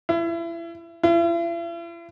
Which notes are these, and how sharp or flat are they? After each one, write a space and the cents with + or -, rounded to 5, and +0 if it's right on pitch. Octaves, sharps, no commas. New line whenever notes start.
E4 +30
E4 +45